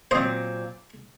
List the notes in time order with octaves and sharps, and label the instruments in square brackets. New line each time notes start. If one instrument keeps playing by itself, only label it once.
[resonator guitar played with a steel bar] A#2 F#3 C4 [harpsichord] C5 D#5